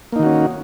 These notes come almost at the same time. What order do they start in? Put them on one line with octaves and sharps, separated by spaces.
A#3 D#4 D#3 F#4 C#4